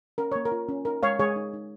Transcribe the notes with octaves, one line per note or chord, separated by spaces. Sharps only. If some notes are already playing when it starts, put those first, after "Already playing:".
C#4 A#4
A#3 C#5
A#4
F4
C#4
D#4 A#4
G#3 C#5 F5
G#3 G#4 C#5
D#4
D#4